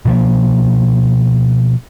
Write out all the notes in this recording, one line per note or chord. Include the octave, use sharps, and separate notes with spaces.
B2 F3 A#3